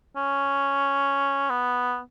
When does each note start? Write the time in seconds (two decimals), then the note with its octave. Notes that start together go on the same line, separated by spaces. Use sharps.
0.16 C#4
1.50 B3